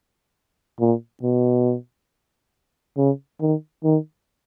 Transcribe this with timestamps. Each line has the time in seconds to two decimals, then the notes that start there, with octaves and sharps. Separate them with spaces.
0.80 A#2
1.23 B2
2.97 C#3
3.41 D#3
3.84 D#3